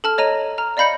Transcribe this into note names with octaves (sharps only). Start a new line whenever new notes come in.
A4 A5 F6
C#5 D#5 A#5 D#7
A#5 F6
D5 D#5 F5 B5 G6 C#7